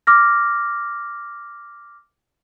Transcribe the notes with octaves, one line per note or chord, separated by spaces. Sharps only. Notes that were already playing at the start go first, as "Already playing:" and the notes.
D6 F6 A#6